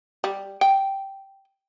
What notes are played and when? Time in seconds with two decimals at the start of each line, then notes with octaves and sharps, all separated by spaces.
0.24 G3
0.61 G5